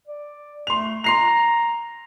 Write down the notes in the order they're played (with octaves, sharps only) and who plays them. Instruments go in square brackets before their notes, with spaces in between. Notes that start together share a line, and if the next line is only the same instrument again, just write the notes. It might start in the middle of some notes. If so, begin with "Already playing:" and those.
[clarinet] D5
[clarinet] A3 [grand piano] C6 F7
[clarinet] A#5 [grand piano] C6 C7 F7